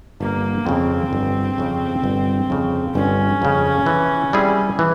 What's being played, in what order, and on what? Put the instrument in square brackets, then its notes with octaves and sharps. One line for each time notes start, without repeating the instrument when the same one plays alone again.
[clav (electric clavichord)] G1 [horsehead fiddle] A#3
[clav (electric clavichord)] F2 C#3 [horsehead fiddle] C4
[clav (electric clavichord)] G1
F2 C#3
G1
F2 C#3
[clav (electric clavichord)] G1 [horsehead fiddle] C#4
[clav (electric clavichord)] F2 C#3
E3
G3 C4 E4 G#4
E3